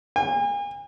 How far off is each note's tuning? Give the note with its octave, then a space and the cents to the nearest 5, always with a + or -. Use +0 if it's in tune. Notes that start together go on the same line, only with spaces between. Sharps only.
G#5 -40